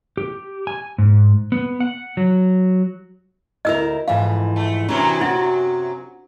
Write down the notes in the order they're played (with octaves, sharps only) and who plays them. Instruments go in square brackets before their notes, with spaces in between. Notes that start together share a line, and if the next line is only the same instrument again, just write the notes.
[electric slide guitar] G4
G#5
G#2
B3
F#5
F#3
[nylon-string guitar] D2 E4 A#4 [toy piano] D#5 E6
[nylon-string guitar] F2 G#2 E3 [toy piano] F5
[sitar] A3
[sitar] F#2 C3 F#3 [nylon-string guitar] E3 D4
[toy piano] E4 [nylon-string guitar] F#4